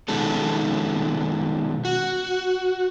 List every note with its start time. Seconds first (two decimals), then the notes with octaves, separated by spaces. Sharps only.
0.08 B2 D#3 G#3 C#4 A4
1.85 F#4